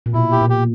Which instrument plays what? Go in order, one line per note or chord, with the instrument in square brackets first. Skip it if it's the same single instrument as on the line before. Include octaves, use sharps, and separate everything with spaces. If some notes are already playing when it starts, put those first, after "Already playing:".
[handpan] A#2
[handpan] B2 [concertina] E4
[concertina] G4
[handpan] A#2
[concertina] G4